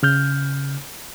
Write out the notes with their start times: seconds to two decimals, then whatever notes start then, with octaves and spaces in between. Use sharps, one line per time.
0.03 C#3 F6 G6